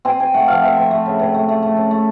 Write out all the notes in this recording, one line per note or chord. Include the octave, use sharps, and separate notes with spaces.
C4 G#5
C4 G#5
A3 F#5
F3 F5
C4 E5
C4
A3
C#3
C3
A3
A3
A3
C#4
A3